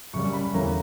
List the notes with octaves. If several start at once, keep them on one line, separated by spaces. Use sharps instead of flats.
F#2 C#3 G3 C#6
B5
E2 D3 A#3 C#4 E4 A#5